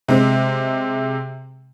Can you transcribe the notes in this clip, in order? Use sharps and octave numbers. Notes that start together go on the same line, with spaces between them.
C3 G#3 C4